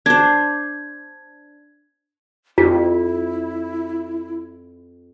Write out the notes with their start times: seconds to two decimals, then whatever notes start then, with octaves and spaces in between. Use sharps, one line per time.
0.06 D4 C5 G#6
2.58 F2 E4 F4